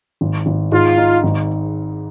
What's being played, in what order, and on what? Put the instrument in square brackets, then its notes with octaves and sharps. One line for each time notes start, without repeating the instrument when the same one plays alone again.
[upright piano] G#1
G#1
[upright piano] G#2 [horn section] F4
[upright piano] D#4
G#1